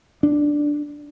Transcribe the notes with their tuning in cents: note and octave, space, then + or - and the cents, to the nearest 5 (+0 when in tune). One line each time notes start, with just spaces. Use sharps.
D4 +0